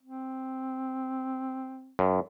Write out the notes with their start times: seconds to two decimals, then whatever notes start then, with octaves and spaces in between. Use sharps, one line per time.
0.03 C4
1.99 F#2